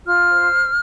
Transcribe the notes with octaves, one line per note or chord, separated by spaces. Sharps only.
F4 F6
C5